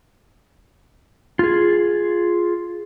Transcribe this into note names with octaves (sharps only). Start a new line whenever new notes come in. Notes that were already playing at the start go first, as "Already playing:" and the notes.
F4 G#4